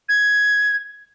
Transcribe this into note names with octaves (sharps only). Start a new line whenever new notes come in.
G#6